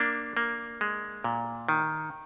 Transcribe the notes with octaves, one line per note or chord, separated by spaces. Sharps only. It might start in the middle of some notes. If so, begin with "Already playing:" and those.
Already playing: A#3 D4
A#3
G#3
A#2
D#3